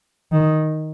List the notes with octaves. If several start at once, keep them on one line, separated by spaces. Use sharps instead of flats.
D#3